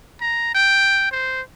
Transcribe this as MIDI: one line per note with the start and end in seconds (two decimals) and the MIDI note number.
0.21 0.52 82
0.55 1.07 79
1.11 1.41 72